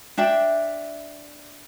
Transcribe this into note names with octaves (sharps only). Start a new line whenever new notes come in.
D4 E5 G5